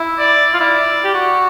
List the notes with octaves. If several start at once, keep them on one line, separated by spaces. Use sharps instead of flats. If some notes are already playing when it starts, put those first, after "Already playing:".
Already playing: E4
D5
F4
E4 D5
G4
F#4